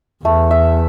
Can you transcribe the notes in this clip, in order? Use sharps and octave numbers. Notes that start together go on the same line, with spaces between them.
E2 A3
E5